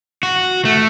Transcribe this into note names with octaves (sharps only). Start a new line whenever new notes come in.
F#4
A3